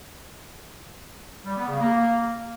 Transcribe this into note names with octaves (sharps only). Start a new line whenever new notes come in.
G3
B3
C#3
A#3